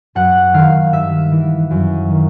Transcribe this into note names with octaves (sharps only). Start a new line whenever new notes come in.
F#2 F#5
D#3 F5
G2 E5
E3
F#2
D#3